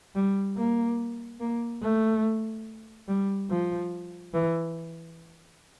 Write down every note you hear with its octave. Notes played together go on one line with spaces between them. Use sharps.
G3
A#3
A#3
A3
G3
F3
E3